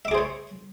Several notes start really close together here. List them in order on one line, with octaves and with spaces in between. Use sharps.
E5 D6 G#4 C5 C#5